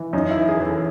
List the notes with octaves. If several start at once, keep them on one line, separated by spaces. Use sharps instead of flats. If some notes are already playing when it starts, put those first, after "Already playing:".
Already playing: E3
F#2 D#4
E4
E3
G#4
E3
A4